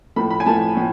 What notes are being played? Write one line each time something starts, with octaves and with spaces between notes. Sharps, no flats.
A2 F3 A3 B5
B5
G#5
A2 F3 A3 A5
A2 F3